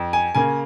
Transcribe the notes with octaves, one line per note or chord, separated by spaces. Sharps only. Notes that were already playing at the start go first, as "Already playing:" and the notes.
Already playing: F2
G#5
C#3 A#3 G#5